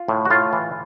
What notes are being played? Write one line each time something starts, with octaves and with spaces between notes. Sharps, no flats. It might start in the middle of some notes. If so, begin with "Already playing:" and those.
Already playing: F4
A2
F#4
A2 F4
E3